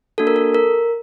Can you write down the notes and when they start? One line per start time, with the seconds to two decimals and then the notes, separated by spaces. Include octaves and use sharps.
0.18 A#3 D4 F#4 A4
0.27 A#4
0.36 A4
0.55 A#4